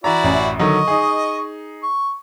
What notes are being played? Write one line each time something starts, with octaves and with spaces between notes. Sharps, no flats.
E3 E4 F#4 D5 A#5
A1 F#2
D3 D#3 F#3 D#5 C#6
D#4 G#4
C#6